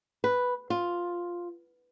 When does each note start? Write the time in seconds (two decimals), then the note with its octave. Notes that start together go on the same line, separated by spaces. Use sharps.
0.24 B4
0.70 F4